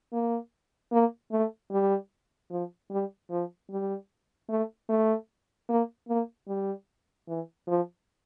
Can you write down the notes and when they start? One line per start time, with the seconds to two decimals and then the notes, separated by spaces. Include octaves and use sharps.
0.13 A#3
0.92 A#3
1.32 A3
1.71 G3
2.51 F3
2.91 G3
3.30 F3
3.70 G3
4.49 A3
4.89 A3
5.69 A#3
6.08 A#3
6.48 G3
7.28 E3
7.67 F3